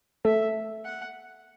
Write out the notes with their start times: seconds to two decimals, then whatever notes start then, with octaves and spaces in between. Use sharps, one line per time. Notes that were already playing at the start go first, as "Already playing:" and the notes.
0.25 A3 A4 E5
0.85 F#5